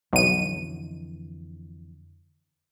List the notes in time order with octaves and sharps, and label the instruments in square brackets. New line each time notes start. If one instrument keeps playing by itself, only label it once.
[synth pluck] B1 D#7 [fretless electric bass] F2 D3 E3